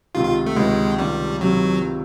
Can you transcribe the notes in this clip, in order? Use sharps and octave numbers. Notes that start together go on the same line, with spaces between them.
C#2 C3 D#3 F4
F4
A3
C#2 C3 D#3 G#3
C#2 C3 D#3 G3
C3 D#3 F#3